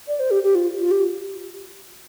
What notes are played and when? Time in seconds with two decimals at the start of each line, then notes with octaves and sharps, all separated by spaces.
0.08 D5
0.20 C5
0.31 G4
0.43 G4
0.55 F4
0.79 F4
0.91 G4